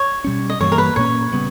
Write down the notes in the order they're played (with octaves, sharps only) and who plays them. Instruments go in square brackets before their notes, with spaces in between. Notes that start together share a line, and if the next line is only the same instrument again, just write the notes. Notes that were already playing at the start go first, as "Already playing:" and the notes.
Already playing: [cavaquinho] C#5
[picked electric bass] B2 G3 C#4
[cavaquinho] D#5
[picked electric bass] G2 E3 G3 A#3 [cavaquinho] C#5
[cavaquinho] A#4
B4
[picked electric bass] A#2 A#3 C#4 [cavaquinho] C#5
[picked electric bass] C#3 G3 B3